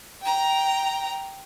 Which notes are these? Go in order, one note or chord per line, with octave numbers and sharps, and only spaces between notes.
G5 A#5